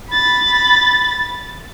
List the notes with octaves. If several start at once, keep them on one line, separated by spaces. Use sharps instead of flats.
B5 A6